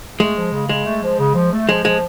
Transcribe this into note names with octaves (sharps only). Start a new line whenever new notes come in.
G#3 A3
F3
C#3
C#3 G#3
A3
F3
C#3
F3
A3
F3 G#3
F3 G#3